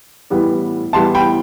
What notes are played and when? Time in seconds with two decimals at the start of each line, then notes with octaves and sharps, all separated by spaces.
0.30 A2 E3 G3 B3
0.93 A2 E3 G3 B3 A5 C6
1.15 G5 B5